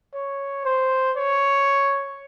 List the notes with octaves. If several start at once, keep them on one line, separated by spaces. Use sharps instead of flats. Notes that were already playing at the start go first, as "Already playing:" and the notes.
C#5
C5
C#5